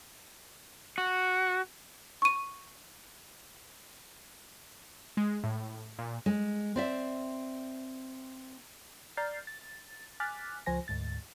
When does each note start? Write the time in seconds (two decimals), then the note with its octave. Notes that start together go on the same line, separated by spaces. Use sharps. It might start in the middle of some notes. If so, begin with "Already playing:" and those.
0.98 F#4
2.22 C#6 D#7
5.17 G#3
5.44 A2
5.98 A#2
6.26 G#3
6.76 C4 D5 E5
9.17 D5 A#5 F6 G6 A6 C7
9.47 A6
10.20 G#5 D6 F6 F#6 A6 B6
10.66 C#2 F3 C5 G#5 A#6
10.88 D2 G#2 A6